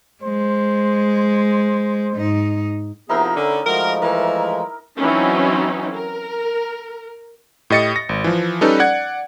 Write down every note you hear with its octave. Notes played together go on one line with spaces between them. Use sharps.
G#3 C5
G#2 D#4
C3 F3 B3 D#4 E4 G#4 A#4
D3 C#4
F3 G#3 A3 F#4 A#4
E3 A#4
E3 F#3 C4 C#4 D#4
A#4
A2 G4 D#5 A6 C#7
A#6
G#1
E3 F3
G3 C#4 D#4 A4 B4
D5 F#5 G#6